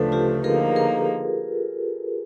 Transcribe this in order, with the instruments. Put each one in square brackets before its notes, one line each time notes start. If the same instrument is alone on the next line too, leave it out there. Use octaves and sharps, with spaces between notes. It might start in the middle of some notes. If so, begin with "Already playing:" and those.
Already playing: [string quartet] D2 C#3 F3 A3 D4 [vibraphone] A4 B4
[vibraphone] F4 G4
[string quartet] D3 F3 A#3 D#4 [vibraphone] G#4 A#4
[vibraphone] G#4 A#4